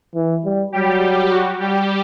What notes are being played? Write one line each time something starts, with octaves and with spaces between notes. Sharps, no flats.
E3
G3
F#3 G3 G4
F#4
G3 G4